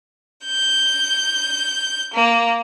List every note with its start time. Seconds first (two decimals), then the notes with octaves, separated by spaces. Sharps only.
0.46 G6
2.13 A#3